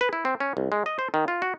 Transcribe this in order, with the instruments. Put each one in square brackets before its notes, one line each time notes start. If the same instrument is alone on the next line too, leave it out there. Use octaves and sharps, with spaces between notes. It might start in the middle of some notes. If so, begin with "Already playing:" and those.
[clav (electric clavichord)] B4
E4
C4
C#4
C2
G#3
D#5
C5
D#3
F4
F#4